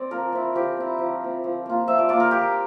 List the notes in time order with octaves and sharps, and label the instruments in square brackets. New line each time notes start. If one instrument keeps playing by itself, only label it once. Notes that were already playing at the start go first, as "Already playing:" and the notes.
Already playing: [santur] C4 D5
F3 A#4
C4 E4
F3 G4
C4 E4
F3
C4 E4
F3
A#3 F4
F3 E5
D5
A#3 F4 D5
A#4
A#3 G4